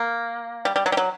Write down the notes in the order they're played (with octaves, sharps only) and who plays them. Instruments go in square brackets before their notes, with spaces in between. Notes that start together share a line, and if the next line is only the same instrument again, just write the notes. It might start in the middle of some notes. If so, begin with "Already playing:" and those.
Already playing: [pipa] A#3
G3
G3
F#3
G3
F#3